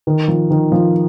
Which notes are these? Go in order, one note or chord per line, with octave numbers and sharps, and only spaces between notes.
D#3
F3
D#3
F3